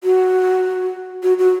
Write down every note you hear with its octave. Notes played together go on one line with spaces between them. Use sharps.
F#4
F#4
F#4